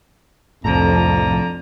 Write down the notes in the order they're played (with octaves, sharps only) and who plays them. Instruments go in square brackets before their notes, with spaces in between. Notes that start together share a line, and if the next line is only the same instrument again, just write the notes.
[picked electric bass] C2 A2 [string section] F2 [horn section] D3 F4 A#5 [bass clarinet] F3